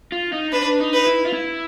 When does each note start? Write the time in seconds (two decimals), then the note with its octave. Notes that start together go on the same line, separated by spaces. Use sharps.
0.12 F4
0.33 D#4
0.52 D4 B4
0.80 D#4
0.93 B4
1.07 E4
1.26 F4
1.33 E4